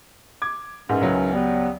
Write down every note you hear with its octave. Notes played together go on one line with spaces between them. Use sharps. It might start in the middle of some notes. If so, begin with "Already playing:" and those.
D6 G#6
G#2 D#3 E3 C#4
C#2 F#3
G3 B3